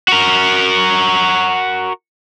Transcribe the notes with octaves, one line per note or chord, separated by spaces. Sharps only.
F#4 A#4